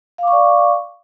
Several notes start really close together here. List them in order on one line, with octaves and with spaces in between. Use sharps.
F5 D6 C#6 D5